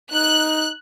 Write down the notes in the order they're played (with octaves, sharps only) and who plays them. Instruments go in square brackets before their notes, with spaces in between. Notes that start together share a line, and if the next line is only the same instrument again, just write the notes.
[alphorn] D#4 [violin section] F#6